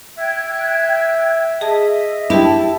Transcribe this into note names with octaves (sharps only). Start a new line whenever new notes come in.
E5 G5 F#6 G#6
G#4 D#5 E5 A5
D4 E4 G4 G5 A5